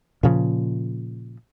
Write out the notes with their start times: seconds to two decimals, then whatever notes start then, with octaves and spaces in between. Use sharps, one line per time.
0.23 A#2 C#3 F3